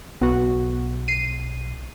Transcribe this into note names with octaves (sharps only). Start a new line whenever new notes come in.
B1 B3 F#4
C7 D#7